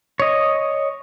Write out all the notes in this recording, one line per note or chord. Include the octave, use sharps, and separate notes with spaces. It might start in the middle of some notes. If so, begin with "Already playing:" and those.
C#5 D#5